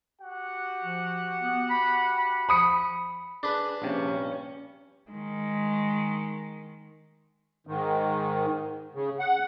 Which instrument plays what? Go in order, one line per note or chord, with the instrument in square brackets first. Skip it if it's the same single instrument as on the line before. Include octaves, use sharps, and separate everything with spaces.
[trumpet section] F#4 G4 F#5
[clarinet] F3
B3
B5
B5
[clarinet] F3 [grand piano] B5 D#6 C#7
[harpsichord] D4 B4 [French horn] G#4
[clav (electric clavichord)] A#1 C3 [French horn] G2 [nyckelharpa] C#4
[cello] D#3 G#3
[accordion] G#2 D#3
C#3
F#5